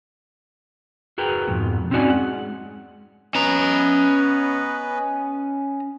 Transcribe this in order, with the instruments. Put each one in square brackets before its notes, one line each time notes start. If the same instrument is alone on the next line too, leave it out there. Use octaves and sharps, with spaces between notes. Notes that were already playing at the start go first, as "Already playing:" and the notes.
[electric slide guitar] F#4 G#4 A#4 B4 G5
F2 G#2 B2
C4 C#4 D#4 F#4 D5 G#5
G#3 F#5
[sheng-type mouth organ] B3 B4 D#5 [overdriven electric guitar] C#4 A#5